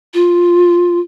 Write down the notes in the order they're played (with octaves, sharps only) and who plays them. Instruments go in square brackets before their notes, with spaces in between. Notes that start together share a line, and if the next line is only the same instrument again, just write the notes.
[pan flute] F4